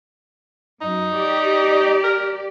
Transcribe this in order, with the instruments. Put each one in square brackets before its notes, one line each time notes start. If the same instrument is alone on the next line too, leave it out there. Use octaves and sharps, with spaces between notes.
[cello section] F#2 [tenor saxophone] D#4
[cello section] G4 D5
[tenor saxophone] A#4